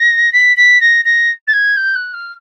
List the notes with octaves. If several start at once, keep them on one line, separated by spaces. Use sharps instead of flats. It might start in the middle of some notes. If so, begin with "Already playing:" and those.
Already playing: A#6
B6
B6
A#6
A#6
A6
G#6
G6
F#6
F6